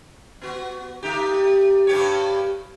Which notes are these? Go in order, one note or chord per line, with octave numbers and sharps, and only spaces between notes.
B3 F#4
A3 D#4 G4
G2 G4 C#5